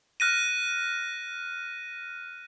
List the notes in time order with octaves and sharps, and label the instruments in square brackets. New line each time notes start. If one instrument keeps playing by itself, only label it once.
[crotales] F6 F#6 A#6 D#7